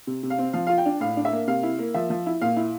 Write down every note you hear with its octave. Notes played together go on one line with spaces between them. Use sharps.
C3
C3
F5
C4
F3 F5
F4 F5
G5
D4
A2 F5
D4
E5
A#3
C3 F5
E4
A#3
F3 E5
F3
E4
A#2 F5
E4